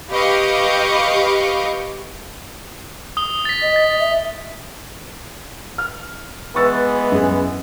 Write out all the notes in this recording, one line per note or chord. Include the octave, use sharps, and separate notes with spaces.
G4 B4 D#5 F5 C#6 D6
D#6 G7
A6 B6
D#5
A6
E5
F6
E3 G#3 B3 B4 C#6 E6 A6
F#2 G#4